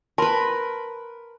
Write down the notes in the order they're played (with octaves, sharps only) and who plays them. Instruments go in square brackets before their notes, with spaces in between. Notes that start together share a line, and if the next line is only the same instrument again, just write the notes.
[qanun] A#4 B4 [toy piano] A5 B5 C6